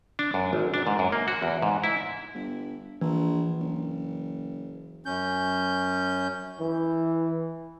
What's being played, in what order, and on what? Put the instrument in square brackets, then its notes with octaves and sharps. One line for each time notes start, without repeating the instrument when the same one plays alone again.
[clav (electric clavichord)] D4
F#2
G#1
D4
G#2
F#2
A#3
F#4
E2
G#2
E4
[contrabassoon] G1
[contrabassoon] A#1 [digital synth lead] E3
[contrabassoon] F#1
[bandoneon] F#2 C#4 G6
[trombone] E3